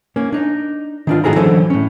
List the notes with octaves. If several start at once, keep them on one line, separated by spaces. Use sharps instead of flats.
A#3 C#4
D4 D#4
D#3 D4 F4
A2 D#4 F#4 G#4 A4 A#5
D3 E3 F#3 C#4 A4 C5
A2 C#4